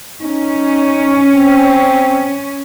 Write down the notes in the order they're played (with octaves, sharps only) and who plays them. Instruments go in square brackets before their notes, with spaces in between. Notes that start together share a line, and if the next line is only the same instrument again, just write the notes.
[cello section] C#4 [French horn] D#4
[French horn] C4